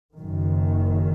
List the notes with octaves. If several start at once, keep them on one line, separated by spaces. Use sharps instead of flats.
F#1 F#2 D#3